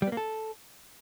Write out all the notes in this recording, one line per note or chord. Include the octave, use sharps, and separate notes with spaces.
G3
B3
A#3
A4